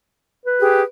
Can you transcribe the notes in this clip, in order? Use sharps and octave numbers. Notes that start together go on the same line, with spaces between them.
B4
G4 G#4